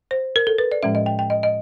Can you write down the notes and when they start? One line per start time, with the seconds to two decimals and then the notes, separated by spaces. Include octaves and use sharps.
0.11 C5
0.36 A#4
0.47 A4
0.58 B4
0.72 D5
0.83 A2 F3 G#3 C#4 E5
0.95 D#5
1.06 G5
1.19 G5
1.30 D#5
1.43 D#5